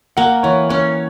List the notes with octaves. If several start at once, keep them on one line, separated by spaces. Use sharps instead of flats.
A#3 F#5
E3 C#5
C#4 C#5